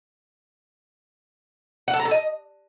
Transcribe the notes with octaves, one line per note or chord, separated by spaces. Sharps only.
F#5
A4
A#5
A4
D#5